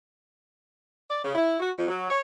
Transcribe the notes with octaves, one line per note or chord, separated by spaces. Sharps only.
D5
C#3
E4
F#4
F2
F#3
C#5